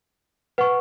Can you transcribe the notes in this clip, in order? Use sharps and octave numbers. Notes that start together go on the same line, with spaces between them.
B4 F#5 C#6